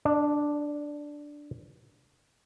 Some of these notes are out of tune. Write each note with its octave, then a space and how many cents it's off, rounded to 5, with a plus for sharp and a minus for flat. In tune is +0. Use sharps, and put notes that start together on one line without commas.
D4 +0 D5 +45